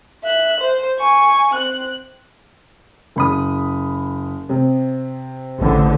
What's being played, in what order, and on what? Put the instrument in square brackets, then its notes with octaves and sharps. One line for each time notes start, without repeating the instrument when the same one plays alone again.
[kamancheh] E5 F#6
C5
G#5 C#6
C4 F#6
[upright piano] F#1 B5 D#6
C3
[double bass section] A1 D3